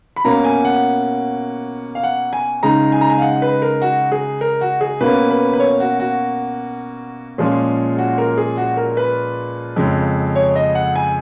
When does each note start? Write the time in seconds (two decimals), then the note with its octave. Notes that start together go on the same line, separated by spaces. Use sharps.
0.16 B5
0.25 B2 A#3 C#4 A#5
0.44 G#5
0.65 F#5
1.95 F5
2.03 F#5
2.33 G#5
2.63 C#3 G#3 D#4 A#5
2.92 G#5
3.01 A#5
3.10 G#5
3.18 F5
3.22 F#5
3.42 B4
3.62 A#4
3.82 F#4
4.12 G#4
4.41 A#4
4.61 F#4
4.81 G#4
5.00 B2 A#3 C#4 B4
5.30 B4
5.53 B4
5.60 C#5
5.80 F#4
6.00 F#4
7.38 A#2 F3 G#3 C#4 G#4
7.98 F#4
8.18 A#4
8.38 G#4
8.57 F#4
8.77 A#4
8.97 B4
9.76 F2 C#3 G#3 C#4
10.36 C#5
10.56 D#5
10.75 F#5
10.96 G#5